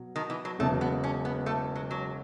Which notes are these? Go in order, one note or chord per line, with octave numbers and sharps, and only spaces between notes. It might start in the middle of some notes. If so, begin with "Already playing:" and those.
Already playing: B2 F#3
D#3
E3
F#3
E1 E2 C#3 F#3 A3
B3
C#4
B3
A3
F#3
F#3